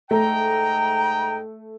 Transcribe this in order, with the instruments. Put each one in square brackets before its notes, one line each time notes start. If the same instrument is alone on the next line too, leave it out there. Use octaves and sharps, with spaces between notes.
[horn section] G#2 D#5 G5 [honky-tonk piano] A3 [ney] A#5